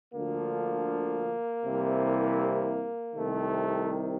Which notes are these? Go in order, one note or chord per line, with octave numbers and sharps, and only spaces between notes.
D2 D3 F3 A#3
C2 C3 E3
C2 C3 D#3 A3